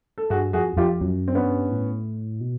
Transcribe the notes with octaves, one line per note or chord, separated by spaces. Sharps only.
A4
G2 F#4 G#4
F2 F#4 G#4
F2 F4 G4
F#2
C4
G2 B3 C#4
A2
B2